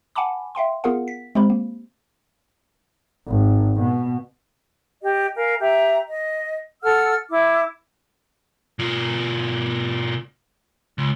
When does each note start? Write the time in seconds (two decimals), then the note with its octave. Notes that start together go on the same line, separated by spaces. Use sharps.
0.16 F#5 G#5 A5 B5 D6
0.55 E5 F5 G5 C6
0.84 B3 F4 G#4 A#4 F5 F#5
1.08 B6
1.35 G#3 C4 G4 C5 B5
1.50 A#3
3.27 G#1
3.81 B2
5.03 G4 D#5
5.36 A#4 F5 G#5
5.60 G4 E5 A#5
6.09 D#5
6.83 A4 F#5 E6 F6
7.30 E4 D6
8.79 B2 F4
10.98 C#2